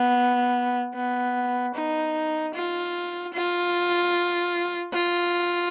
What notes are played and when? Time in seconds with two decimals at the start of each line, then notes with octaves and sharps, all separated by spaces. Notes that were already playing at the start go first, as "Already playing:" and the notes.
Already playing: B3
0.94 B3
1.74 D#4
2.54 F4
3.33 F4
4.92 F4